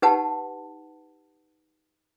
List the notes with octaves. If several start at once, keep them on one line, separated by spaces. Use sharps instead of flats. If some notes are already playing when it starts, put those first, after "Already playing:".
D#4 G4 B4 F#5 A5